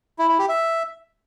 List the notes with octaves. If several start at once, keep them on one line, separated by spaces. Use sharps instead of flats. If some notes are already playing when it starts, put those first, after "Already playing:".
E4
E4
G4
E5